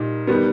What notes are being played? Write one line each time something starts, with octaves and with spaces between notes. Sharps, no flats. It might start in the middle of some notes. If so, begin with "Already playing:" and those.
Already playing: A#2 G3 D#4
D#3 G3 B3